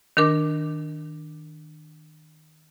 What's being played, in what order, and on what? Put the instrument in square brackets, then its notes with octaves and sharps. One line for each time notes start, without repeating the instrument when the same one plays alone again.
[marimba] D#3 D4 A#4 D6